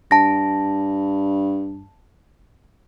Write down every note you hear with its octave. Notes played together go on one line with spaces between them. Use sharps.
G2 A5 A#6